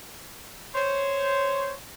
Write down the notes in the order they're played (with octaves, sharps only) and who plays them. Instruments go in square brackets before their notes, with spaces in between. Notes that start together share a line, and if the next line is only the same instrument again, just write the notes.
[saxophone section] C5 C#5